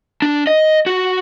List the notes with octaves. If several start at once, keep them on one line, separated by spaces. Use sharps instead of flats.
D4
D#5
F#4